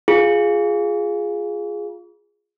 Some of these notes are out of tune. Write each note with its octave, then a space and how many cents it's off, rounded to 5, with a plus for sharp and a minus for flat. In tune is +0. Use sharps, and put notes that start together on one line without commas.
F4 +0 G#4 +0